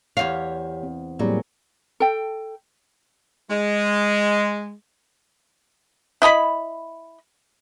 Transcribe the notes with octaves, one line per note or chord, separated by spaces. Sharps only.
E2 G4 C5 C#5 F5
C4
A2 F#3 G3 A#3 C4 G#4
A4 G5
G#3
E4 D#5 A#5 B5